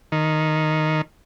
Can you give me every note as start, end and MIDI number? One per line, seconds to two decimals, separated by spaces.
0.12 1.01 51